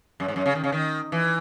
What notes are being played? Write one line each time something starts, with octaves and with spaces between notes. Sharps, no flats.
F#2
G#2
F#2
C#3
D#3
C#3
D#3
E3